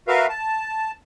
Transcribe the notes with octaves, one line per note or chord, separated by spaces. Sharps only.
F#4 A#4 B4 E5 F5
A5